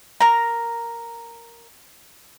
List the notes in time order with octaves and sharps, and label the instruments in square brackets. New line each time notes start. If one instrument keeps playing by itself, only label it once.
[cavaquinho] A#4 A#5